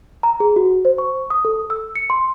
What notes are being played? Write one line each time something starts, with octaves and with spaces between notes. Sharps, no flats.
A#5
G#4
F#4
C5
C#6
D#6
A4
E6
C#7
C6